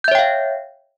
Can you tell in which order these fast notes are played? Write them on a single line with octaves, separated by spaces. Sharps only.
G6 E5 C#5 G5 F5